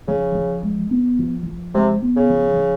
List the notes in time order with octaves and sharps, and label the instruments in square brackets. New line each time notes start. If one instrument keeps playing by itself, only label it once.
[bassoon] C#3 [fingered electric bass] F3
[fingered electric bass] F3
G#3
B3
F3
F3
[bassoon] C3 [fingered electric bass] G#3
[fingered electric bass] B3
[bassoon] C#3
[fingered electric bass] F3
F3